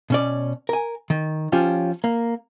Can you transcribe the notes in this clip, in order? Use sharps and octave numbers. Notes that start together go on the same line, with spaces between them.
B2 C#4 D5
A#4 G#5
D#3
F3 C#4 F4 G4
A#3